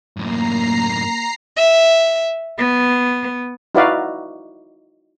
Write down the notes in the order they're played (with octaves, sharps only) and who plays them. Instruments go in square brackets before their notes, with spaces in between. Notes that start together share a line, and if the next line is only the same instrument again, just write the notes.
[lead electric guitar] F#2 A2 [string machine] A#3 [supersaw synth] A#5 C7
[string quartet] E5
B3
[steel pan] D#4 E4 F#4 B4 D5 F5